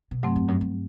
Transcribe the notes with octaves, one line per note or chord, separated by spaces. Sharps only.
B2
G2 C3 F#3 A3 C4
E2
F#2
G2